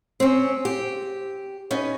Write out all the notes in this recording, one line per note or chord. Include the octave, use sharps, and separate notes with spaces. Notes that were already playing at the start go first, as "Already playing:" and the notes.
C4 C#4
G4
B3 C#4 D#4